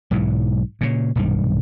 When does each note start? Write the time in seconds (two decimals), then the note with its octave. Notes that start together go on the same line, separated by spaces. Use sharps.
0.11 B1 G#2 E3 F#3
0.81 A#2 C#3
1.16 D#1 B1 G2 D#3